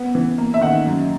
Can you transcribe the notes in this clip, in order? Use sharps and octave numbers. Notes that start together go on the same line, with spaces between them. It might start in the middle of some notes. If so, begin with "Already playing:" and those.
Already playing: B3
E3
A#3
E5
D#3 F#5
F#2